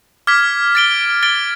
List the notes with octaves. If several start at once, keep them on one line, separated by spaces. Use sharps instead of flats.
D6 F6 G#6 B6
A6 D7 G7
A6 D7 G7